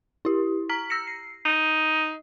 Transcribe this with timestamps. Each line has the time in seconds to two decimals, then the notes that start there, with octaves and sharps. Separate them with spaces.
0.25 E4 G4
0.69 A#5 F6 B6
0.90 E6 A#6 C#7
1.07 C7
1.45 D#4